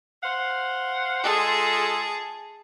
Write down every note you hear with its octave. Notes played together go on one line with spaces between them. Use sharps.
C5 F5 F#5
G#3 F4 G#4 A4 A5